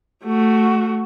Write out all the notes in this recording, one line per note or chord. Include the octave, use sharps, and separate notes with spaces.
A3 F#4